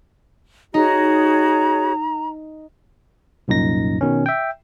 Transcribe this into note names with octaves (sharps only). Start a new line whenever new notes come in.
D#4 F#4 G#4 C#5 A#5
C2 F#2 A#2 D#4 A#6
B2 D#3 C#4
E5 G5